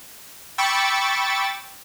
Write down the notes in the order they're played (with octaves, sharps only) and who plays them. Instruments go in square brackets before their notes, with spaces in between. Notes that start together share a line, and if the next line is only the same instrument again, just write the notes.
[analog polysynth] G5 B5 C#6 D6 E6 A6